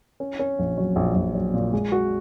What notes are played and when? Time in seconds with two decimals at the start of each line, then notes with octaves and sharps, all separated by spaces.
0.20 C#4
0.39 C#4
0.59 A#1
0.78 F#3
0.96 A#1
1.15 A#1
1.35 F#3
1.54 A#2
1.73 G#3
1.92 F#4